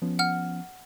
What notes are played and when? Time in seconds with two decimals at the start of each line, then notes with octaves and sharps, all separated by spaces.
0.02 F3 B3 C#4
0.19 F#5 F6